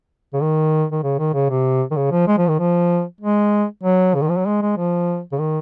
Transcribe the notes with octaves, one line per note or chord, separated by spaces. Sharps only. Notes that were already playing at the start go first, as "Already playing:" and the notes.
C#3
D#3
D#3
C#3
D#3
C#3
C3
D#3
C#3
F3
G#3
F3
D#3
F3
G#3
F#3
C#3
D#3
F3
F#3
G#3
G#3
F3
C#3
D#3